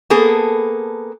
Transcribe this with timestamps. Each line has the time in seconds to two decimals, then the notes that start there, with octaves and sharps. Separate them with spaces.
0.10 A#3 B3 G#4 A4